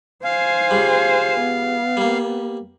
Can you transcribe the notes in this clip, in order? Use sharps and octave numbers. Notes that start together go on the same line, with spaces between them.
C5 F5 G#5
C#2 G3
B3
G3 A#3